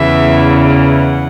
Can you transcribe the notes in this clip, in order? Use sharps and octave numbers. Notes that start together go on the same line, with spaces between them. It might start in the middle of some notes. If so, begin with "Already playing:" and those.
Already playing: E2 C#3 E3 E5
F#5